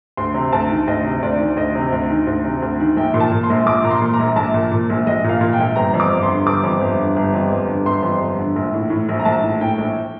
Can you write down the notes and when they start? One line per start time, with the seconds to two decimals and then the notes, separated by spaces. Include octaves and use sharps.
0.17 D2 C6
0.34 C3
0.52 D2 A5
0.70 D#3
0.87 D2 D#5
1.04 C3
1.22 D2 D5
1.39 D#3
1.57 D2 D#5
1.75 C3
1.92 D2
2.10 D#3
2.27 D2
2.44 C3
2.62 D2
2.80 D#3
2.97 A#1 G5
3.14 A#2
3.20 A5
3.32 A#2
3.44 C6
3.50 A#1
3.66 A#1 D6
3.84 A#2 A#5
3.90 C6
4.02 A#2
4.14 A#5
4.19 A#1
4.36 A#1 A5
4.54 A#2
4.71 A#2
4.90 A#1
5.06 A#1 D#5
5.24 A#2
5.29 F5
5.41 A#2
5.53 G5
5.59 A#1
5.76 G1 A#5
5.94 F2
6.00 D6
6.12 G1
6.23 C6
6.28 D3
6.46 G1 D6
6.64 F2
6.81 G1
6.98 D3
7.16 G1
7.34 F2
7.51 G1
7.68 D3
7.86 G1 C6
8.03 F2
8.21 G1
8.39 D3
8.56 A#1
8.74 A2
8.90 A2
9.09 A#1
9.19 A#5
9.25 A#1 A5
9.43 A2
9.61 A2 G5
9.78 A#1